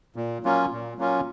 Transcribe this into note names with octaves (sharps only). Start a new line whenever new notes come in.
A#2
F#3 A#3 C#4 F4
A#2
F#3 A#3 C#4 F4